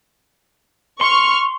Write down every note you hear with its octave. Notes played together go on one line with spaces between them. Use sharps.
C6 C#6 F6